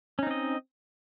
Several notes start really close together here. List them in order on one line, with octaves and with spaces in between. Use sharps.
C#4 D#4 C4 D#5